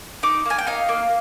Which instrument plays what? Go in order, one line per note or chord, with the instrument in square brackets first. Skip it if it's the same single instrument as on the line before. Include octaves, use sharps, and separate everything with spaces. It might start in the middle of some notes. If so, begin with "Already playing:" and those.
[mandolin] D#4 D6
A#3 G#5
G5
D#4 F5
A#3